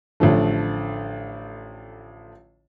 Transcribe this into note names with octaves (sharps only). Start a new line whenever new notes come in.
A1 D3 F3 A3